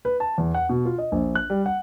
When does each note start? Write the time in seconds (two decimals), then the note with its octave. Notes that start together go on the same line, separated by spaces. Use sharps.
0.05 B4
0.20 A5
0.38 E2
0.55 F#5
0.69 B2
0.85 F4
0.98 D#5
1.12 A#1
1.35 F#6
1.50 G3
1.66 F#5